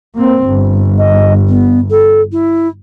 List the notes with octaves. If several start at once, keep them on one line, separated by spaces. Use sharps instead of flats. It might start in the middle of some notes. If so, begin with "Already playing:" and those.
A#3 C4
G1
D#5
B3
A4
E4